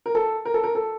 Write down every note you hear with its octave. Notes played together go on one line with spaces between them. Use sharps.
A#4
A4
A#4
A4
A#4
A4